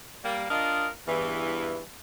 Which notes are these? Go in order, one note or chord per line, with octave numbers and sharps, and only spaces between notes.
G3 A#3
D4 F4 A#4 D#5
E2 G2 E3